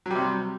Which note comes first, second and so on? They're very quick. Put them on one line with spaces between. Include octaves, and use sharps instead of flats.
F#3 G3 C3